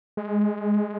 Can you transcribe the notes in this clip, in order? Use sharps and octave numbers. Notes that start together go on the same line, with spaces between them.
G#3